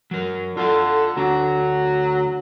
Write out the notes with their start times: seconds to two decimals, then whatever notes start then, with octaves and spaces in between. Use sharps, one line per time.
0.11 F#3 A#4
0.57 D3 F4 A4 F5
1.17 D2 F#3 D4